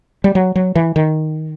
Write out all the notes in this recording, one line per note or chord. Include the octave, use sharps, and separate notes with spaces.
G3
F#3
F#3
E3
D#3